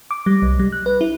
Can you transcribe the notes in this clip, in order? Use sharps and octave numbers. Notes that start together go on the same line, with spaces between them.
D6
G3
C2
G3
F#6
B4
E4